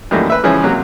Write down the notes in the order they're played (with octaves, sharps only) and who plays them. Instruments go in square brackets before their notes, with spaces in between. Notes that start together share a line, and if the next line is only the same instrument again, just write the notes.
[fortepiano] F#2 D#3 E3 G3 A3 A#3
B4 E5
C#3 E3 F3 G#3 C#4 G#4
C3 F#3 A#3